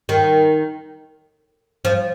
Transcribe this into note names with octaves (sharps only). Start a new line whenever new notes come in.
D#3
F3